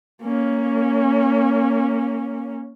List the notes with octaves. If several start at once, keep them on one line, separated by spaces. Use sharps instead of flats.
A#3 C#4